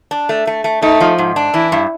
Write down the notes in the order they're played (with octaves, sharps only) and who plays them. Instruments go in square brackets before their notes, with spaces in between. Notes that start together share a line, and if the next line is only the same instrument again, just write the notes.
[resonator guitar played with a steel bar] D4
A3
A3
A3
[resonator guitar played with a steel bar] A3 [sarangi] D#4
[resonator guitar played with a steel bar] F3
G#2
D4
[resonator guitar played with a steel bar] E3 [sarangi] E4
[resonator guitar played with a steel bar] G2